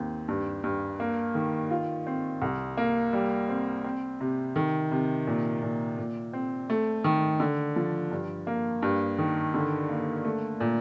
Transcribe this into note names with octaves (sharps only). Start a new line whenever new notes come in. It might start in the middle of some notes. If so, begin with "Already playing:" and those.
Already playing: D#2 C4
G2
G2
A#3
D#3
F4
C4
C2
A#3
G3
C4
C4
C3
D#3
C3
A#2
A#2
A#2
C4
A3
D#3
D3
F3
G2
A#3
G2
D#3
D3
A#3
A3
A#2